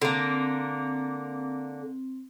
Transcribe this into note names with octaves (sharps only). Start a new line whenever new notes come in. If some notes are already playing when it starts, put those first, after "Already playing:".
D3 A#3 C4